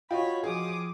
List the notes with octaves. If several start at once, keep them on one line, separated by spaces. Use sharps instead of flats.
F4 F#4 C#5 D#5 G5 B5
F3 G#4 D6 D#6